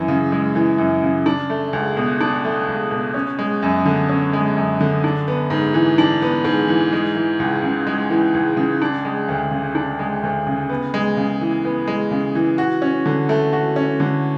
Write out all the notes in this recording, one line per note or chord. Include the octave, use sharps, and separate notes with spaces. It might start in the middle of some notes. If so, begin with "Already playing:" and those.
Already playing: F#2 E3
C#3
G#3
E3
F#2
C#3
D4
A3
C#2
B2
D4
A3
C#2
B2
C#4
G#3
F#2
D3
C#4
G#3
F#2
D3
D4
B3
G#2
E3
D4
B3
G#2
E3
G#3
E3
C#2
C#3
G#3
E3
C#2
C#3
D4
G#3
D2
C#3
D4
G#3
D2
C#3
B3
G#3
C#3
E3
B3
G#3
C#3
E3
F#4
C#4
D3
A3
F#4
C#4
D3